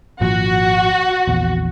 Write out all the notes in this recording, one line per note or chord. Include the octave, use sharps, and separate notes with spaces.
G#1 A#2 F3 F#4
A#1 E2